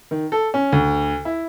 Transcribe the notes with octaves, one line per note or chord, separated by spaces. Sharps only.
D#3
A4
C#4
D2
E4